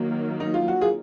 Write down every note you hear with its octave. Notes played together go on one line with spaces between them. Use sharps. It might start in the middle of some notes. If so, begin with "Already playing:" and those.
Already playing: D#3 F#3 A#3
D#4
F4
F#4
F4 G#4